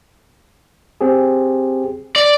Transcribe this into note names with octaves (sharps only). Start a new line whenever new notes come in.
C4 G4 G#4
D5